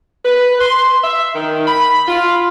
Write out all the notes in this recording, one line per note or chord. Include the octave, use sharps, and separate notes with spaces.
B4
C6
E5
D#3
B5
F4